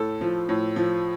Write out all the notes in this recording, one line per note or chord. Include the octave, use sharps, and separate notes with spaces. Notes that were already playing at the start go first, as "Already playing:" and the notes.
Already playing: A2 A4
F3
A2
F3